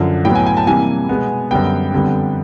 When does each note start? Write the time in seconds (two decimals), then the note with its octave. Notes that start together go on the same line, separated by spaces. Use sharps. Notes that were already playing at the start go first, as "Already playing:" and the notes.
Already playing: F#2 D3 F3
0.25 A2 F#3 B3 G5
0.35 G#5
0.46 G#5
0.57 A5
0.67 C3 E3 G3 A#3 G#5
1.09 B2 G#3 B3
1.51 F#2 D3 G3 B3 G5
1.92 F2 D3 G3 B3